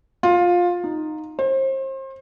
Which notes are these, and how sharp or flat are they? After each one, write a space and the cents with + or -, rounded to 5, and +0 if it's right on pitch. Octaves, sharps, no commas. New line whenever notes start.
F4 +15
D#4 -10
C5 +35